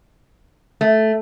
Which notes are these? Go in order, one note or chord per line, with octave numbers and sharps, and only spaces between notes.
A3